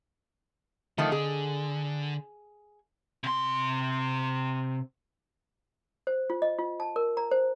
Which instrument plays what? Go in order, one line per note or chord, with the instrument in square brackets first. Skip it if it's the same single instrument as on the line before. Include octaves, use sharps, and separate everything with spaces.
[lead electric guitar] D3 [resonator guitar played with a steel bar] D#3 F3 A3
[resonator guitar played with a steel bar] G#4
[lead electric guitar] C3 C6
[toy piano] C5
F4
D#5
F4
A5
A#4
A#5
C5